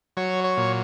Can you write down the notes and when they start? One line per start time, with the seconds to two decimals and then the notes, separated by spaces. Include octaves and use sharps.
0.17 F#3 C#5
0.44 C#5
0.57 A#2